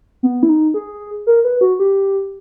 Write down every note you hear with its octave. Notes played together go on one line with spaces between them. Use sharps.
B3
E4
D#4
G#4
A#4
B4
F#4
G4